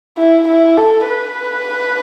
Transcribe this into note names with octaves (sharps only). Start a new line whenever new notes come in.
E4
E4
A4
B4